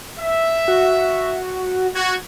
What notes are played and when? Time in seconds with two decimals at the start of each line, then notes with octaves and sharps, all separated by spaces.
0.19 E5
0.68 F#4
1.95 F#4 G#6